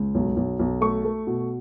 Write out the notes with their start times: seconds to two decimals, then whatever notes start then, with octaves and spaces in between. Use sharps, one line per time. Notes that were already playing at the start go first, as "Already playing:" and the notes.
Already playing: C#2
0.15 B1
0.37 B1
0.59 B1
0.81 A3 C#6
1.05 A3
1.27 B2